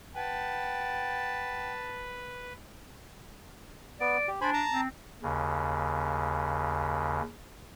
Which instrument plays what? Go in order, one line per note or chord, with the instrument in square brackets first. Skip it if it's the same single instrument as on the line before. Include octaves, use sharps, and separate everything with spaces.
[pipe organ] B4 [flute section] F#5 G5 [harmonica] A5
[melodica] B3 [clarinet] D5
[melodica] G4
[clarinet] D4 [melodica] C5 G#5 B5
[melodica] A5 A#5
[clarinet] C4
[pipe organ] D#2 C#3